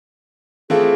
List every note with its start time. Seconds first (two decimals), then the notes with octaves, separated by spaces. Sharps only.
0.70 E3 A3 C4 F4 G#4 A4